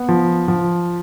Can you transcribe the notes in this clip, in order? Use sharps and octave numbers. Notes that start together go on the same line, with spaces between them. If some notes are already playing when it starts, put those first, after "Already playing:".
Already playing: B3
F3
F3